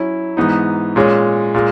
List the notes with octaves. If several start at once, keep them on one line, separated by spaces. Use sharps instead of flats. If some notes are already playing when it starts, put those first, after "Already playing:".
Already playing: F#3 C#4 E4
G#2 E3 B3 D#4
A#2 G#3 C#4
A#2 G#3